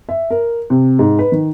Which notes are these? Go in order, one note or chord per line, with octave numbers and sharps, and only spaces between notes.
E5
A#4
C3
G#2
B4
D#3